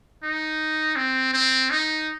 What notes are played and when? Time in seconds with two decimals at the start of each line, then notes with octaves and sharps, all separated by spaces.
0.23 D#4
0.96 C4
1.33 C4
1.70 D#4